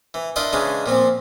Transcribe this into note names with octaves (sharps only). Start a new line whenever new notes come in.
E3
D4 E4 F4 A#4 D5 D#5
C#3 E3 G#3 C#4 D4
A#2 F3 C4